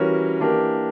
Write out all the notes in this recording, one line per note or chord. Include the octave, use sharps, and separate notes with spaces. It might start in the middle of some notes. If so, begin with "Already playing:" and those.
Already playing: E3 G3 C#4 F#4 A#4
E3 A#3 D4 G4 A#4